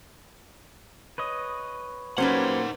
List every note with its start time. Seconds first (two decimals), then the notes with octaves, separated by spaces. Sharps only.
1.18 B4 C#5 D#5
2.18 F#3 A#3 C#4 D#4 G4 B4 C5 F#5